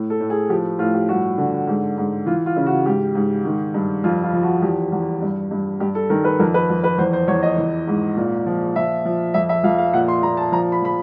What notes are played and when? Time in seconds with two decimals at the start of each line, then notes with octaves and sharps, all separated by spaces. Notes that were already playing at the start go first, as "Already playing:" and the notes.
Already playing: A2
0.10 A4
0.20 A2
0.30 G#4
0.50 F3 G4
0.79 A2 F4
0.94 G4
1.09 G2 F#4
1.38 D3
1.67 G#2
1.97 G#2
2.26 E3 F4
2.46 F4
2.56 C#3
2.66 F#4
2.86 G#2 G4
3.15 G#2
3.45 D#3
3.74 G2
4.04 F2 F4
4.23 F4
4.33 F3
4.43 F#4
4.62 E2 G4
4.92 E2
5.22 G2
5.51 G2
5.80 G2 G4
5.95 A4
6.10 D#3 A#4
6.25 B4
6.39 F2 A#4
6.54 B4
6.70 F2
6.84 B4
6.98 E2 C5
7.13 C5
7.28 E2 C#5
7.43 D#5
7.58 E3
7.87 G#2
8.16 A#2
8.46 F3
8.76 F3 E5
9.05 F3
9.34 F2 E5
9.49 E5
9.64 F2 F5
9.78 F5
9.93 A#2 F#5
10.08 C6
10.23 A#2 A#5
10.37 A5
10.52 F3 A#5
10.72 B5
10.82 F3 B5